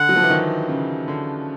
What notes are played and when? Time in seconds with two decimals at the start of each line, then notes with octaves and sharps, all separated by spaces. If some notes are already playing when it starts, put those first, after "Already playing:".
Already playing: D3 F#5
0.09 F#3
0.16 F3
0.23 E3
0.30 D#3
0.69 C#3
1.08 D3